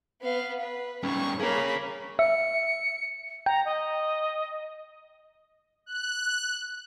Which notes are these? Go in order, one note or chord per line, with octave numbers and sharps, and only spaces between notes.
B3 F5
B4
G3 C#4 C#6
A#3 G#4 C#5 B5
E5 C#7
G5 A#5
D#5
F#6